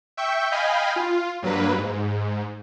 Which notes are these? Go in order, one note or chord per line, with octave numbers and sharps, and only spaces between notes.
E5 G5 C#6 G6
D#5 F5 G5 G#5 B5
F4
G2 F#3 A#3 B4
G#2